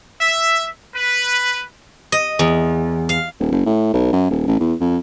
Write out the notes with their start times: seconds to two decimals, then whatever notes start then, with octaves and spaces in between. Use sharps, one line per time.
0.20 E5
0.94 B4
2.12 D#5
2.39 E2
3.09 F5
3.40 D#1
3.52 F#1
3.66 A2
3.93 B1
4.13 F#2
4.30 D#1
4.47 A1
4.60 E2
4.80 F2